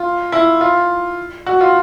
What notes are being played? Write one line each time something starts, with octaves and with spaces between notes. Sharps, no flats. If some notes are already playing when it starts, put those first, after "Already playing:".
Already playing: F4
E4
F4
F#4
F4